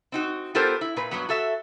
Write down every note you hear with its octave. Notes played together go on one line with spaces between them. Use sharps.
C4 D#4 F#4
B3 F4 G4 A4 A#4 C5
E4
A#2 B4
G2 F#3 B3
F#4 A4 E5